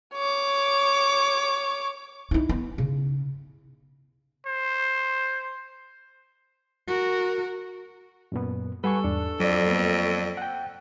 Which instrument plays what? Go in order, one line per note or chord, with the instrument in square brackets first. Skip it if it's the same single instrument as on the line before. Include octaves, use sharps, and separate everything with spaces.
[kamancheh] C#5 D6
[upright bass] D#4 E4
B3
C#3
[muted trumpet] C5
[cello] F#4 A#4
[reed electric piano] F#2 A#2 B3
[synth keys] G3 C#6 [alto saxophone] A4 [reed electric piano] B4 F#5 G#5
[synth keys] E2 G#2 [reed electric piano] D4
[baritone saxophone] F2 [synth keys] F#3 D5
[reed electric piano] A#3 B3
F#5 G5